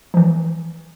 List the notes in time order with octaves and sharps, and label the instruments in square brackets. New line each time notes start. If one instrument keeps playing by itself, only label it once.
[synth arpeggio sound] E3 F3